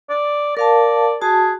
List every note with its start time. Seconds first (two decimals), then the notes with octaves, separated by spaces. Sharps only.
0.09 D5
0.57 A#4 D5 F5 A5
1.22 F#4 G#4 A5